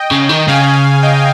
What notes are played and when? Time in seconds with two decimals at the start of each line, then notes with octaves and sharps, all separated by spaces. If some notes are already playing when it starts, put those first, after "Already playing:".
Already playing: D#5 G5
0.11 C#3
0.29 D#3
0.48 C#3 F5 G#5
1.02 D#5 G5